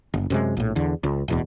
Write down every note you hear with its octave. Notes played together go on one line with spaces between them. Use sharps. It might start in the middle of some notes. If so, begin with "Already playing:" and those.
F#1
F#2 C3 G#3
A#1 A2
E2 D3
C#2
D1 E2 B2